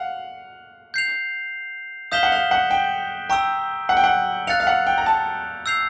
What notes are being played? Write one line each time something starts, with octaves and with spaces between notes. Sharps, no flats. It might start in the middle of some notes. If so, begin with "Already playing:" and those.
Already playing: F5 F#5
G6 C7 F7
F5 D#6 G6 B6 E7 G7
F#5
F5
F#5
G5
G5 A#5 C#6 E6
F#5
G5
F#5
F5 F#6 A6 C#7 F7
F5
F#5
G5
A#5
A5
E6 G6 C7 F7